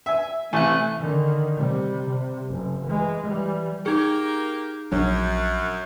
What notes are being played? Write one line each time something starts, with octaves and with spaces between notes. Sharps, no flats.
E5 G#5
A1 C3 A3 G#5 F#6
D3 D#3
C3 G3
C3
F#1
E3 G#3
E3 G3
A#3 D#4 G4 G#4 A#4
A#1 F#2 F#3 D4